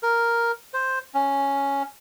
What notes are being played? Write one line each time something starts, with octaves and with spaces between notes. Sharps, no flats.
A#4
C5
C#4